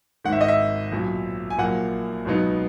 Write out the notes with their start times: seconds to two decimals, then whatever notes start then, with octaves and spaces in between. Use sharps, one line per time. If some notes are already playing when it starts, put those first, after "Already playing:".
0.24 G#1 G#2 D#3 F#5
0.32 E5
0.41 D#5
0.48 E5
0.92 B1 A#2 F#3
1.50 G#5
1.58 A#1 A#2 F#3 A#3 F#5
2.25 C#2 B2 F#3 B3 D#4